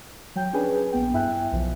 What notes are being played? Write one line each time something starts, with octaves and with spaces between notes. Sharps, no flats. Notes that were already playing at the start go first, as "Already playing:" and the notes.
F#3 G5 G6
C#4 D4 G#4 B4 G#5
A#1 B3 G5
G2 E4 E5 G5 G#5 F#6
B1 F3